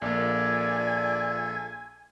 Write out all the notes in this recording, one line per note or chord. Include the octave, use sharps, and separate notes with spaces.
A#1 A#3 F4 A4 D5 G#5